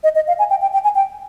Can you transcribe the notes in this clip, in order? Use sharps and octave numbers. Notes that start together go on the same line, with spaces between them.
D#5
D#5
F5
G#5
G5
G5
G5
G#5
G5